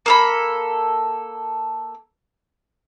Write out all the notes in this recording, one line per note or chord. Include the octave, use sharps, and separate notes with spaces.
A#3 A4 B5